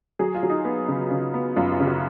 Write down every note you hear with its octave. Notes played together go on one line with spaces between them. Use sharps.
F#3 G#4
F4
F#3
D#4
B3
C#3
C#3
B3
F#2 F4
F4
C#3
F#4